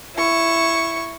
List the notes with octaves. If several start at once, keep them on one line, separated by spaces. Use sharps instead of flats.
E4 C#6